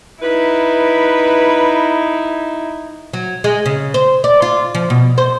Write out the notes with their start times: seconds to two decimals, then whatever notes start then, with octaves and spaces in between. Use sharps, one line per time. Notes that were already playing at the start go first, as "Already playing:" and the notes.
0.22 D#4 E4 B4
3.13 F#3
3.44 G#3
3.66 C#3
3.94 C5
4.24 D5
4.42 F4
4.75 F3
4.90 B2
5.18 C5